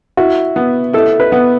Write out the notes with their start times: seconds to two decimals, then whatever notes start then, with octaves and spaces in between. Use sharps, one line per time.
0.17 E4 F#4
0.56 B3
0.93 E4 A4
1.20 B4
1.32 B3